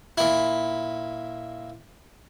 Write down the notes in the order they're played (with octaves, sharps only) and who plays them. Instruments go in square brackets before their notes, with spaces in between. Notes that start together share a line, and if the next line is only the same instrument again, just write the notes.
[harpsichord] A#2 E4